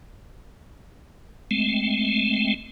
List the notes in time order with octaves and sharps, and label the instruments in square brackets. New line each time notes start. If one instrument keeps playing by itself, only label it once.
[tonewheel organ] G#3 A3 C4